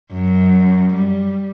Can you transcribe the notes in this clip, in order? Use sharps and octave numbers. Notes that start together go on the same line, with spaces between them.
F#2
G3